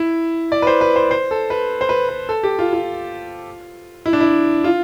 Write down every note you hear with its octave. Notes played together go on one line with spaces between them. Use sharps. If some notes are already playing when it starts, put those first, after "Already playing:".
Already playing: E4
D5
B4
C5
B4
C5
C5
A4
B4
C5
B4
B4
A4
G4
F4
F4
E4
D4
E4
F4